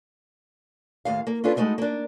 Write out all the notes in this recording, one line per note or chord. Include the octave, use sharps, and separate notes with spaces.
D#2 A2 E3 F5
A#3
C#4 D4 F4 A4 B4
G#3 A3 B3 D#4 E4 F#4
A#3 D4